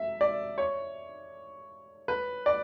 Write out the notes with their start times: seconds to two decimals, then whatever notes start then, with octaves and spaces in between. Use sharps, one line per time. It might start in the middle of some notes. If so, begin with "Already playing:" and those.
Already playing: E5
0.21 D5
0.58 C#5
2.08 B4
2.46 D5